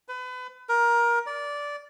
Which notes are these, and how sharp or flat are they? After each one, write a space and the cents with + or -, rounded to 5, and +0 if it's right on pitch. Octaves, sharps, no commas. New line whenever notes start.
B4 +30
A#4 +20
D5 -15